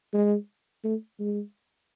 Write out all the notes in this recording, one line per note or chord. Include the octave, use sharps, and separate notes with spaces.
G#3
A3
G#3